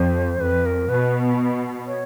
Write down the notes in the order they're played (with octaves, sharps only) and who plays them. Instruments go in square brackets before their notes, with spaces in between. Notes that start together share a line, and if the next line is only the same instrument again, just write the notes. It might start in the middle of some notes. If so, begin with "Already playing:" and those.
Already playing: [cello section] F2 [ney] C5
[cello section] F2 [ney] B4
[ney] A#4
[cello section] B2 [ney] B4
[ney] C#5